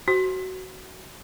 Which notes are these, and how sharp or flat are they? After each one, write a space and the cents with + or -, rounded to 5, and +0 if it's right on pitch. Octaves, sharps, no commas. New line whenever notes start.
F#4 +15 C5 +0